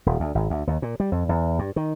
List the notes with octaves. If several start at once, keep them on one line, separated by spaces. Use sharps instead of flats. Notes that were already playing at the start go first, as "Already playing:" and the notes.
D#1
D2
G#1
D2
D#2
A#2
G3
F2
E2
G2
D#3